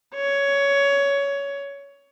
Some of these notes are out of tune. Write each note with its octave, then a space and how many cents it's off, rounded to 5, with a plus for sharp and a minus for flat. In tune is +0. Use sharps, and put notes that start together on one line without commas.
C#5 +15